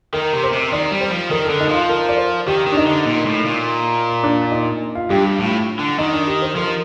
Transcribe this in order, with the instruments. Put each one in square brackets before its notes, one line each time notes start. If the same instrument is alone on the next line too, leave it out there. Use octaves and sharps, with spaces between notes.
[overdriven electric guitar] D#3 [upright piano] A#4
[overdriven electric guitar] C3
[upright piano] C5
[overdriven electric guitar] C3
[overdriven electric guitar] D#3 [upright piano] D5
[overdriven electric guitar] G3
[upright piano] C5
[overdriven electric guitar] F3
[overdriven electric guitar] D#3 [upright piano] A#4
[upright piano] A4
[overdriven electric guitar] D3
[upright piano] D#4
[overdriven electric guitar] F3 [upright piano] F4
[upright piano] A#4
D5
C5
[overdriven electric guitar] D#3 [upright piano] G4
[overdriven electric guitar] D#3
[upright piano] D4
D#4
[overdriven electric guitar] D3
A#2
A2
A#2
[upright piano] D4
D#4
F4
[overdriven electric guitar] G2 [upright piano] G4
[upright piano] G4
[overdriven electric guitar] A2 [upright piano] F4
[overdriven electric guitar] D3
[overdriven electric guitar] D#3 [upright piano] D#4
[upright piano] D4
G4
C5
[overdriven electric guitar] F3 [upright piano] A#4